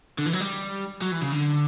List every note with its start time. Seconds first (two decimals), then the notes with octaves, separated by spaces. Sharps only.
0.19 D3
0.26 E3
0.33 F#3
0.40 G3
1.02 F#3
1.12 E3
1.22 C#3
1.33 D3